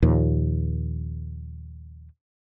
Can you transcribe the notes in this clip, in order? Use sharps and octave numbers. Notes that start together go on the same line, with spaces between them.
D#2 A#2 F3